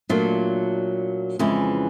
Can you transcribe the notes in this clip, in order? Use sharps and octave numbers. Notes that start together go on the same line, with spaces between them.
A#2 F#3 A3 D4 F4
F2 C#3 E3 G#3